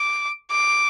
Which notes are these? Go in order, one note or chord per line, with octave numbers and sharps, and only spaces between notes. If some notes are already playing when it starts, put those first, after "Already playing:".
Already playing: D6
D6